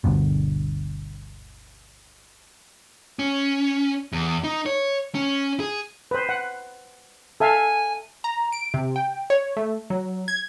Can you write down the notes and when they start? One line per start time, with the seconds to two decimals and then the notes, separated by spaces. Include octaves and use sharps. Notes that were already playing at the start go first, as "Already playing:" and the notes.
0.04 G1 D2 G2 B2
3.19 C#4
4.13 E2
4.44 D#4
4.66 C#5
5.15 C#4
5.60 G#4
6.11 B4 C5
6.29 F#5
7.40 A4 E5 F5 G#5
8.24 A#5
8.52 D7
8.74 C3
8.96 G5
9.30 C#5
9.57 A3
9.90 F#3
10.28 G#6